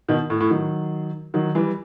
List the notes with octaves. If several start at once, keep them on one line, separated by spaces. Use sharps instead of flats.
B2 D#3
A2
A2
D#3 F#3
D#3 F#3
E3 G3